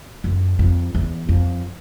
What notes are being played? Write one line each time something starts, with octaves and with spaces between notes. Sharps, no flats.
F#2
F2
E2
F2